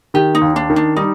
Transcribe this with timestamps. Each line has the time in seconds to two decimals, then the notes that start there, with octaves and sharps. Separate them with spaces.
0.14 D#3 G4
0.35 D#4
0.41 D#2
0.56 D4
0.70 D#3
0.76 D4
0.96 G3 D#4